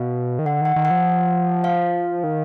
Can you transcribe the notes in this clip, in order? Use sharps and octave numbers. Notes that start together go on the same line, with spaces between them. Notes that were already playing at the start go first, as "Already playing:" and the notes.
Already playing: B2 F5
D#3
D3 F#5
D#3 F#5
D#3
F#5
F3
F5
D#3